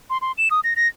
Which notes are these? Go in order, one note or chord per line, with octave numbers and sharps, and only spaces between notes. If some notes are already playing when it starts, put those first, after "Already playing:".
C6
C6
E7
D#6
A#6
A#6